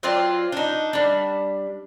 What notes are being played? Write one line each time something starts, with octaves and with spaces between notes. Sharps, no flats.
F#3 C4 F4 D5
D4 D#4
G3 D4